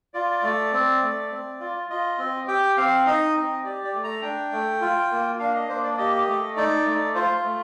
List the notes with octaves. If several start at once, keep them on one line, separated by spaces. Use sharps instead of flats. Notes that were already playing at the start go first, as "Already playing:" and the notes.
F4 D5
A3
C4
A3
C4
F4
F4 D#5
C4
G4 G5
C4 F5
D#4 D#5
C4
G4 D5
D5
A3
A#5
D4 G5
A3
F4
A#3
D4 F5
D#5
A#3 C5
D5
G4 D#5
A3
D#4 D5
A3
F4 C5
A3